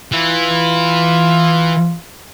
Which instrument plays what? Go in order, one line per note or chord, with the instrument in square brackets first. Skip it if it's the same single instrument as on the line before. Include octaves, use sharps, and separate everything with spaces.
[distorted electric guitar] E3 [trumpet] F4